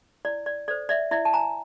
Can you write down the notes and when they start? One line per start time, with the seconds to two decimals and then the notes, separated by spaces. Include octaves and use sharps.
0.25 E4 D5
0.46 D5
0.68 A4 C5 D5
0.89 D5 E5
1.11 E4 D5 E5
1.25 A5
1.33 G#5 A#5